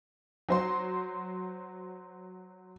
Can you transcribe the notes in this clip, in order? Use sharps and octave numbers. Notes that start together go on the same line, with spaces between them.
F#3 C5 C6